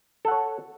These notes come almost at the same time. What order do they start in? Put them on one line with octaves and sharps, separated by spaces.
A4 F#5 C#5